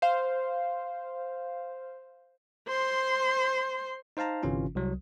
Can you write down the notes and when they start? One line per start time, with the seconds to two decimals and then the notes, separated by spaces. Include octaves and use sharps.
0.02 C5 F5
2.68 C5 C6
4.17 D#4 C5 F5 A5 A#5
4.43 G1 C3 E3 C#4 F4
4.75 C2 F#3